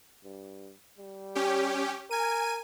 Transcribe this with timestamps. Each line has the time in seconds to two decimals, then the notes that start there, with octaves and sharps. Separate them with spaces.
0.24 G2
0.98 G3
1.35 C#4 G4
2.11 A#4 G#5 D#7